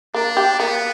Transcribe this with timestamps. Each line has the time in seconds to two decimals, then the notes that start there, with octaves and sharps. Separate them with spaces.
0.14 A#3 D4
0.37 G4
0.59 A#3 B3